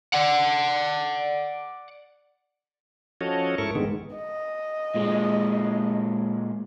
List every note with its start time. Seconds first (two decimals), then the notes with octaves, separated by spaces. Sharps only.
0.14 D5 F#5
3.21 F3 C#4 F#4 A4 C#5 D#5
3.58 G#2 E4 A4 A#4 C#6
3.75 G#2 D3 D#3 G#3 B3
4.15 D#5
4.95 A#2 G#3